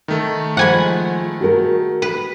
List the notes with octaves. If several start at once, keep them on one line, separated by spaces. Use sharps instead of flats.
D#3 A3
F3 G#3 F#5 G#5 B5
F#4 G#4 A#4
B4